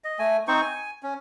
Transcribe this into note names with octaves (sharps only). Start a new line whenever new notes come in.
D#5
A3 G#5
C4 D#4 C5 C#6
G#5
C#4